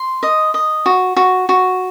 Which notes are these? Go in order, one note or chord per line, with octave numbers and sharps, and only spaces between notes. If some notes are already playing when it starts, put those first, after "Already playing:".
Already playing: C6
D#5
D#5
F#4
F#4
F#4